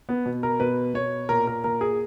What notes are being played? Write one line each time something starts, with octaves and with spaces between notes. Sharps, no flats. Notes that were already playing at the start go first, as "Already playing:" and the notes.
B3
B2
A#4
B2 B4
B2 C#5
A#2 A#4
A#4
A#2 A#4
G#4